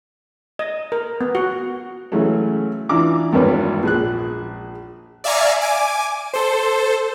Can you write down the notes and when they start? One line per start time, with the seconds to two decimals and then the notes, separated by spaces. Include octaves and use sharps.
0.59 D#5
0.92 A#4
1.21 B3
1.35 F#4
2.12 C#3 E3 F#3 G#3 A3 C#4
2.89 E3 D4 F4 A#5 D6
3.33 G#1 E2 G2 A#3 B4 C#5
3.83 A#1 G#4 F#6
5.24 D5 E5 F5 G#5 A#5 C#6
5.61 G#5 D6
6.34 A4 C5